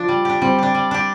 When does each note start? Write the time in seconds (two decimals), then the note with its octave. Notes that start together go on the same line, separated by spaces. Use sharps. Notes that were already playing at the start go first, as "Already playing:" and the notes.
Already playing: F3 D4
0.08 G3
0.25 D4 G4
0.42 G3 C4
0.58 D4 G4
0.75 G3
0.91 D4 G4